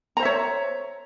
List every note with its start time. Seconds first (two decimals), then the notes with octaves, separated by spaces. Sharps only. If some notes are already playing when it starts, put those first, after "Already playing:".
0.17 A#5
0.20 C5
0.22 E5
0.25 C#5